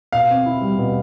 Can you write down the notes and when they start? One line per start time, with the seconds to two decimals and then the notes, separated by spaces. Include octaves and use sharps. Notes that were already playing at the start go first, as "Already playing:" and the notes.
0.12 B2 F5
0.30 C4
0.46 E4
0.61 G3
0.78 B2